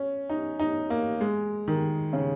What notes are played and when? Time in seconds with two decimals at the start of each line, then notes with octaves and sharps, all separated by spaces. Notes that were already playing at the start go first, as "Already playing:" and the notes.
Already playing: C#4
0.30 D#4
0.59 D#4
0.90 A#3
1.21 G#3
1.68 D#3
2.13 C#3